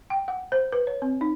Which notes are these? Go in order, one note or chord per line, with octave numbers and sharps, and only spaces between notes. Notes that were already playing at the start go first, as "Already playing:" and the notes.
G5
F#5
C5
B4
C#5
C4
D#4